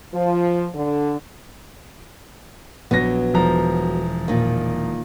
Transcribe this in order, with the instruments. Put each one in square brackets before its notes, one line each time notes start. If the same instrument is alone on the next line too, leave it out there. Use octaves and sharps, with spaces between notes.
[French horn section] F3
D3
[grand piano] A#1 A#6 [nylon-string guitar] F#3 B3
[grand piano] E1 F3 A#5
[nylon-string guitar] A#2 D#3